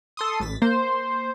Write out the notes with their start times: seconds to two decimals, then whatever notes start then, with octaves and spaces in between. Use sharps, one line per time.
0.17 A4 C6 D#6
0.40 A1 A6 B6
0.62 A#3 C5